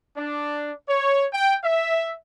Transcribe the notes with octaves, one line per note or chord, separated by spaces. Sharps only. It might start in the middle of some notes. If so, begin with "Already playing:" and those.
D4
C#5
G5
E5